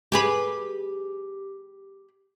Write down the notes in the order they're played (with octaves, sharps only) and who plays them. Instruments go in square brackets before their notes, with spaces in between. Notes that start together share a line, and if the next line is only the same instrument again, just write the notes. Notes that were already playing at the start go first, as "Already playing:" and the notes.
[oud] G4 G#4 B4